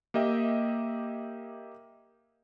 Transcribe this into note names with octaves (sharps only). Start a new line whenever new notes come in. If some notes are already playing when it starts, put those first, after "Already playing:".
A#3 G4 D#5 E5 G5